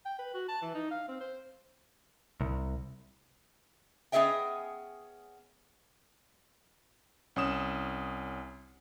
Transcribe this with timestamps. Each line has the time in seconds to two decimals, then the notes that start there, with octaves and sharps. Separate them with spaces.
0.05 G5
0.19 B4
0.34 F#4
0.49 A5
0.62 E3
0.75 D#4
0.91 F5
1.08 C4
1.21 C5
2.41 C2
4.12 B3 C#4 G#4 D#5 E5 G5
7.36 C2 C#4 D#6 E7